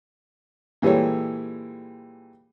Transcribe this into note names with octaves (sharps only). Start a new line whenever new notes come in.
A#2 E3 G3 G#3 A4 C#5